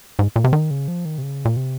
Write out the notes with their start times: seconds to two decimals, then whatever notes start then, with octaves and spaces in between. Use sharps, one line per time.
0.19 G#2
0.36 A#2
0.44 C3
0.53 D#3
0.71 C#3
0.88 F3
1.05 D#3
1.18 C3
1.22 C#3
1.45 A#2
1.57 C3